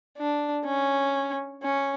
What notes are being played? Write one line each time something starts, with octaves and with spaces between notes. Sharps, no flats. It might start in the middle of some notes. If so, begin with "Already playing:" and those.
D4
C#4
C#4